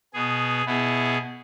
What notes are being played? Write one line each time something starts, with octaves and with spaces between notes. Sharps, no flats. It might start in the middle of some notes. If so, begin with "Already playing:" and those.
B2 B3 G#4
B2 B3 E4 G#4